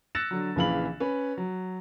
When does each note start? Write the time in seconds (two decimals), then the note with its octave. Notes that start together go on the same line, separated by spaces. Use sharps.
0.15 E6 F#6 A6 A#6 C#7 E7
0.31 D3 F#3
0.56 A#1 C#3 E3 F5 B5 F#7
1.00 C#4 B4
1.37 F#3